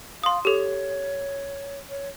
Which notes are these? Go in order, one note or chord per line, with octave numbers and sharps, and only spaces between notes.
F5 C6 D#6
G4 A4 C#5
C#5